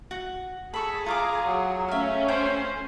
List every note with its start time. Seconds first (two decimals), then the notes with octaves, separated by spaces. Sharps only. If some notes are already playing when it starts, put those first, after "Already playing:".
0.11 F#4
0.74 G#4 A4 B5 C#6
1.06 F4 F5 A#5 D6
1.46 F#3
1.88 A3 C#4 E5 F5
2.28 C5 G5